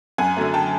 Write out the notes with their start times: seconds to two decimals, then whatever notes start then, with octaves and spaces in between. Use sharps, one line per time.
0.18 F#2 F#5 G#5
0.37 D3 F#3 A3
0.54 G5 A5